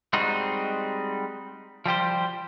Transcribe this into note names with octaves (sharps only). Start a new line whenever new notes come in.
G3 G#3 C4 D#4 F#4
F3 G3 G4 C5